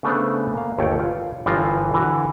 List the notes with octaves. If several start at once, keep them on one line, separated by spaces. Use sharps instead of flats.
C#3 A3 B3 D4 A4 C5
A#3 F5
G1 D#2 A3 C#5 G5
F4 B4 D5
G1 G2 E3 F3 F4 A#4
D3 E3 F#4